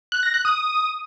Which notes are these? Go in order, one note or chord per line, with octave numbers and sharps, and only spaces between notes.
F#6
A#6
F#6
D#6